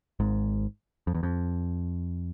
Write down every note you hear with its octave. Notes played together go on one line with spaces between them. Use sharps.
G#1 G#2
F2
E2
F2